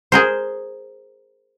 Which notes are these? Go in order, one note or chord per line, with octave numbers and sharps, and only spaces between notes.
G#4 A#4 C5